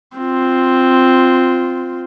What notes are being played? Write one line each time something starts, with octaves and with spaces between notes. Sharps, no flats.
C4 F4